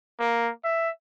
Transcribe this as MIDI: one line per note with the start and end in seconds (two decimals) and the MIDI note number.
0.19 0.51 58
0.64 0.90 76